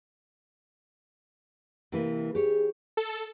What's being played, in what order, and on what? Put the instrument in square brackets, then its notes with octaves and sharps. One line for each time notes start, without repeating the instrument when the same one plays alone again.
[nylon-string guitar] C3 E3 A#3
[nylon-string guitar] G4 C#5 [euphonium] G#4
[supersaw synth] A4